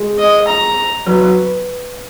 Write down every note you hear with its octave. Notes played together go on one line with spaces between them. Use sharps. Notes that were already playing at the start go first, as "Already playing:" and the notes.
Already playing: G#3
D#5
A#5
F#3 B4
F#3